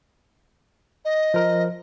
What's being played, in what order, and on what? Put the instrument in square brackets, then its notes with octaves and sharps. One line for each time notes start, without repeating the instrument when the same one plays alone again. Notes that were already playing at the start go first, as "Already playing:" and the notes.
[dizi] D#5
[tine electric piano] F3 A#4